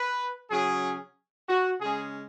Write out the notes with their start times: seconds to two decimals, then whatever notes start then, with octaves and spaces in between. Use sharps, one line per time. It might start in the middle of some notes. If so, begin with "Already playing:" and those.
Already playing: B4
0.51 C#3 F#3 C#4 G#4
1.48 F#4
1.81 C#3 G#3 C#4 G#4